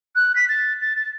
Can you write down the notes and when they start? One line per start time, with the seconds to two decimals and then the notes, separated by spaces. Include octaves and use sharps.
0.15 F#6
0.35 B6
0.49 A6
0.81 A6
0.96 A6